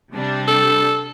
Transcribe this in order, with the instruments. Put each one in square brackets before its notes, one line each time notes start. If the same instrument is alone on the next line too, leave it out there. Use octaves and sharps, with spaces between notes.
[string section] C3 G3 D4
[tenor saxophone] A4